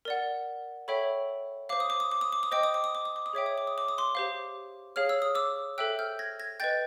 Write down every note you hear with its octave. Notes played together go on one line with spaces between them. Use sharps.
A#4 D5 F#5
A4 C#5 E5 G5 B5 C#6
C5 F5 D6
D#6
D6
D#6
D6
D#6
D6
D#6
C5 D#5 G5 D6
D#6
D6
D#6
D6
D#6
D6
D#6
G#4 C#5 E5 G5 D6
D#6
D6
D#6
D6
D#6
C6 D6
G4 C5 F5
G#4 C#5 F5 F6
E6
D#6
D6 E6
A4 C5 E5 G5 E6 F#6
F6 G6
G#6 A#6
G#6 A#6
B4 D#5 G5 G6 A6